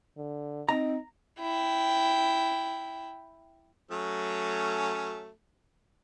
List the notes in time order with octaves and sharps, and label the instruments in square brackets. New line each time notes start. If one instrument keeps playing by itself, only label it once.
[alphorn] D3
[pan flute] C4 [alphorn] D#4 [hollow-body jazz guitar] A#5
[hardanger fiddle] E4 G5
[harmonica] F#3 A3 C#4